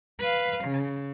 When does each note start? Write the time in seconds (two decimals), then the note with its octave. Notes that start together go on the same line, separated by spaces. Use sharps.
0.20 B4 F5
0.64 C#3